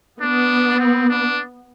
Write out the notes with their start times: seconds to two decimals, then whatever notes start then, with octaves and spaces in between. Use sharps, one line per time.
0.22 B3 D4
0.80 C4
1.09 D4